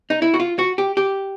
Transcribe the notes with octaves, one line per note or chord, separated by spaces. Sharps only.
D#4
E4
F#4
F4
F#4
G4
G4